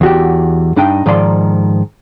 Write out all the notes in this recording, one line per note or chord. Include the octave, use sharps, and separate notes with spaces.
E2 F#4 G4
G2 D4 D#4 G5
G#2 D#3 F3 D5 B5 C6